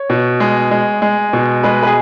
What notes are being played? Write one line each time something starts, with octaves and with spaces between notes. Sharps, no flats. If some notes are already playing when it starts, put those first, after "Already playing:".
Already playing: C#5
B2
G#3
G#3
G#3
B2
G#3 B4
B4
G#4